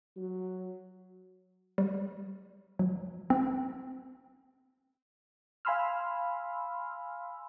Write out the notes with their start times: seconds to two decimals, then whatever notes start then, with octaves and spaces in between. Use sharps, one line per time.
0.17 F#3
1.78 G3
2.79 F#3
3.30 C4
5.65 F5 G#5 B5 C6 E6 F6